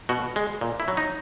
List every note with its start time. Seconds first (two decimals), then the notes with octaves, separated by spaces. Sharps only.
0.09 B2 F#4
0.36 G#3
0.61 A#2
0.80 E4
0.88 F#3
0.97 D#4